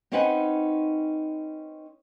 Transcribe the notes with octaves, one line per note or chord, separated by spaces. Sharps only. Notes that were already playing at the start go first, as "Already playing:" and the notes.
C4 C#4 D#4 B4 F#5 G#5